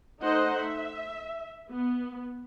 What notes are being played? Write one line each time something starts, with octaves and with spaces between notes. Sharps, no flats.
A3 D#4 C5 D#5 F#5
E5
B3